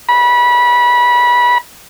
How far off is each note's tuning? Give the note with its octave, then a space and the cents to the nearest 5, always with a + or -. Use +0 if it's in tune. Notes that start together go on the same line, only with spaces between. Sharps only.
B5 -25